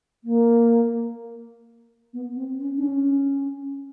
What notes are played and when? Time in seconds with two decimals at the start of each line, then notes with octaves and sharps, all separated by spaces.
0.24 A#3
2.13 B3
2.36 C4
2.60 C#4
2.77 D4
2.83 C#4